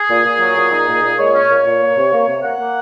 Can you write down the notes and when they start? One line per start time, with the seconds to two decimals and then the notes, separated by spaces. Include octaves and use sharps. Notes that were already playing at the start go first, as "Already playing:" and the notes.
Already playing: G#4
0.10 A#2
0.25 A#2
0.41 F#3
0.57 A#2
0.72 D#4
0.88 A#2
1.03 A#2
1.19 G#3 C#5
1.34 C#4
1.50 A#2
1.66 A#2
1.82 A#3
1.97 C3
2.12 A#3
2.28 C3
2.44 A#3 F#5
2.59 A#3